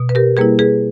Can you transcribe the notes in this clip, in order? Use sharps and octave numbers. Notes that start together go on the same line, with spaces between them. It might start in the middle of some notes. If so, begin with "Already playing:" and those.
Already playing: B2
B4
G4 A#4
G3 A#3 E4 G#4 B4
G#4 B4